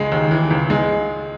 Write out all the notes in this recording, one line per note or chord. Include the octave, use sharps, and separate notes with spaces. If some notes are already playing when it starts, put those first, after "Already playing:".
Already playing: C#2 G#3
D#2
E3
C#2
G#3